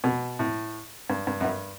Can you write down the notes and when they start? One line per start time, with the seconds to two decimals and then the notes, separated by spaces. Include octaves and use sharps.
0.04 B2
0.39 A2
1.10 G2
1.27 G2
1.41 F#2
1.45 G2